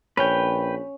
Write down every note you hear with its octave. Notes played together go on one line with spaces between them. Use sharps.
A#1 C#4 B4 G5